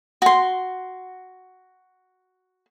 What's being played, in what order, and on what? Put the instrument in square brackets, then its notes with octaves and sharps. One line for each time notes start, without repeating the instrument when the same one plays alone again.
[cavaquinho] F#4 C6